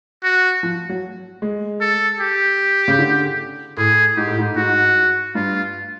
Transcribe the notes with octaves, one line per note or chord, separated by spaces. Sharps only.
F#4
F3
F#3
G#3
A4
G4
C#3
D3
A2 G#4
G#2 G4
A2
G#2
G#2 F#4
G2 F4